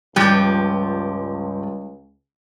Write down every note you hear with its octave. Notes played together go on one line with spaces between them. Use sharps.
C#2 G2 F3 G3 G4